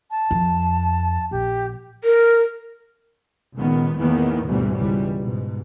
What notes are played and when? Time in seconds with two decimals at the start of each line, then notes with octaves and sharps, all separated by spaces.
0.11 A5
0.31 F2
1.31 A#1 G4
2.04 A#4
3.55 C#2 A#2 D#3 B3
3.98 E2 A2 D#3 E3 A#3 B3
4.45 G#1 D2 G#2 B2 E3 G3
4.75 C#2 E3 G3
5.19 G#2 B2